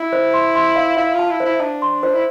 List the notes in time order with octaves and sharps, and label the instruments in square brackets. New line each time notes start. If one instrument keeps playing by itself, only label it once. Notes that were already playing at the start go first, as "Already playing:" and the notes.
Already playing: [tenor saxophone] E4
[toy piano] C5
C6
C6
F5
[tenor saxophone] E4 [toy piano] F5
[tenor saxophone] F4
[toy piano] A5
[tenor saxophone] E4
[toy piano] C5
[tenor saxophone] E4
[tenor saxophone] D4 [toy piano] A5
[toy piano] C6
C5
[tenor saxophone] E4